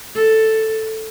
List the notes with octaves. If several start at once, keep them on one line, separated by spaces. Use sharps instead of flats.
A4